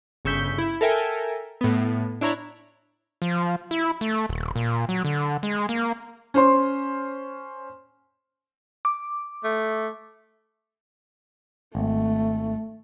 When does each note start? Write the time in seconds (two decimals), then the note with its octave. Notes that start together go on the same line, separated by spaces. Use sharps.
0.25 G1 C#3 C#6 E6 G6 B6
0.58 E4
0.81 A4 A#4 E5 G5 G#5
1.61 A2 B3
2.21 D4 E4 C#5 A#5
3.22 F3
3.71 E4
4.01 A3
4.29 D#1
4.56 A#2
4.89 F#3
5.05 D3
5.43 G#3
5.69 A#3
6.34 C#4 C5 C6
8.85 D6
9.44 A3
11.75 G#1 A3